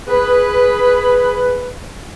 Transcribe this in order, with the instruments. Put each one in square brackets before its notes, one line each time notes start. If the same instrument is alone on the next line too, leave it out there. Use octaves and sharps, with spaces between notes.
[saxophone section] G#4 B4